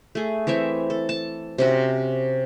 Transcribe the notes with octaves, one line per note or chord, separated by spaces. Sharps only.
A3 G#4
E3 C4 C#5 E5
A4
A5
C3 C#4 F#4